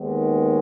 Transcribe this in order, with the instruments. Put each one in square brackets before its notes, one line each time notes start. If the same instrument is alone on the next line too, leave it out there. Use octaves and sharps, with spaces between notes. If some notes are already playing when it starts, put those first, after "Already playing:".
Already playing: [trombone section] D#2 D#3 G#3 B3